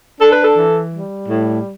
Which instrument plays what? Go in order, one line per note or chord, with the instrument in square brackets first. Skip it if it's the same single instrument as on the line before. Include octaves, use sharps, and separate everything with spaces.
[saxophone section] D4 A4
B4
A4
E3
G3
A2